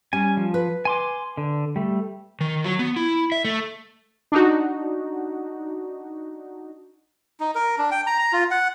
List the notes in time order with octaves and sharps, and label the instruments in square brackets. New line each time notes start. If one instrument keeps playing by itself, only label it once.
[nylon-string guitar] G3 C#4 [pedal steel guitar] G#5
[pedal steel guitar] F3
[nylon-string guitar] B4
[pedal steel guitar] G#5 C6 D6
D3
G3 A3
[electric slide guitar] D#3
F#3
B3
E4
E5
A3
[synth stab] D4 D#4 F#4
[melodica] D#4
A#4
D4
G5
A#5
A#5
F4
F#5